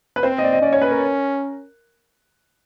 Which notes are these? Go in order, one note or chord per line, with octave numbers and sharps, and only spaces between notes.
B4
C4 C5
D#5
D5
D#5
C#4 D5
C#5
B4
A#4